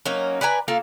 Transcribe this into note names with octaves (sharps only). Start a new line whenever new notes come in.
F#3 A#3 C#4 D#4
B4 D5 G#5 A#5
A#3 F4 A4